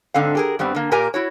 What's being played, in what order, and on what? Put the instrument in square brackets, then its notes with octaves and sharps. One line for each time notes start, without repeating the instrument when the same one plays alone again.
[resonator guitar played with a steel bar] G#2 D3 C4 F5
G4 G#4 A#4
G2 G3 B3 C4
D3 A#3
A#2 A#3 G4 A#4 G#5 A#5
E4 F#4 C#5